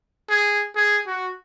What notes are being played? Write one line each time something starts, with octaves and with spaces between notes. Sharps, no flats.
G#4
G#4
F#4